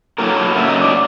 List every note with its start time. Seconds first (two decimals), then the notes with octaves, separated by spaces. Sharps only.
0.18 A2 F#3 A#3 A#4
0.56 C#3 F#3 A#3 E5
0.69 D#5
0.81 D5